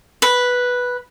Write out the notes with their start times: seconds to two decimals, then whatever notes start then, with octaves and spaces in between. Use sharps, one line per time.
0.22 B4